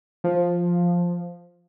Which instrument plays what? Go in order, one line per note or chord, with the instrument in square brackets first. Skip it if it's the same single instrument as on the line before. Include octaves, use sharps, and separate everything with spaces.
[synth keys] F3